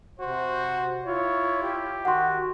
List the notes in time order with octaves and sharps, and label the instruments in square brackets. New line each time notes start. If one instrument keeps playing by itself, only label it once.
[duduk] C3 [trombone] F#4 [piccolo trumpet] C5
[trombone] E4 [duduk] F4 [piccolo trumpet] C#5
[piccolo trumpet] G4
[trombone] D#3 [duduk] F#4 [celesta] F#5 C6